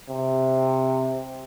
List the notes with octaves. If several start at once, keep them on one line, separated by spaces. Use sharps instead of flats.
C3